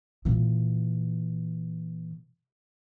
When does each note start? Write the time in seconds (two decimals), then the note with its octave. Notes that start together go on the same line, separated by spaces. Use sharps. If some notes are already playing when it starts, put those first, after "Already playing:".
0.25 A#2 E3